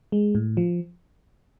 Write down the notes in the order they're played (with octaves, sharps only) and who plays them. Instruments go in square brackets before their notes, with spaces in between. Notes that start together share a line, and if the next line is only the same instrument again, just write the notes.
[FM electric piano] G#3
A2
F3